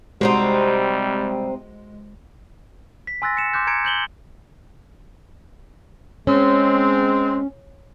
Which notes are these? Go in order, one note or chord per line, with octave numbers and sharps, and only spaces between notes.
C3 G3 G#3 C4 D#4 F#4 C5
B6
G#5 C6 E6 F#6 A6 A#6
C#7 E7
C6 D6 F#6 G6
A#5 G#6 C#7 D7
G6 F#7 G7
G#3 C4 C#4